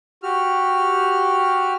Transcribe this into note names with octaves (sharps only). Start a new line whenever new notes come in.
F#4 G4 F6